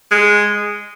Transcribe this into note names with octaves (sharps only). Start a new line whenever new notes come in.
G#3